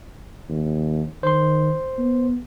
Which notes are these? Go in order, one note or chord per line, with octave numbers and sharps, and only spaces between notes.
D#2
D#3 C5 C6
B3